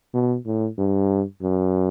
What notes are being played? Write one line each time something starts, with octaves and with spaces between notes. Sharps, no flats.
B2
A2
G2
F#2